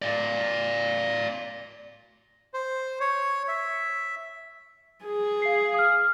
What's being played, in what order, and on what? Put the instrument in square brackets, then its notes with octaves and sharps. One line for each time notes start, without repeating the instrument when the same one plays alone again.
[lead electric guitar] D5 F5
[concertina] C5
C#5
E5
[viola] G#4
[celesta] F5 C7
D#6 F6